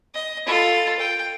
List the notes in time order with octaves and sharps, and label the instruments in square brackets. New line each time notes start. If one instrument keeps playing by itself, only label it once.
[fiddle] D#5
F4 A4
G5